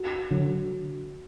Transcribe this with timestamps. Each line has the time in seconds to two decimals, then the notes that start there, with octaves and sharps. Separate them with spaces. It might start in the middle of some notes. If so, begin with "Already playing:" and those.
Already playing: F#4
0.31 D3 F#3